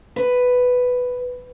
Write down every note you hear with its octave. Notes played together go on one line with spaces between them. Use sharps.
B4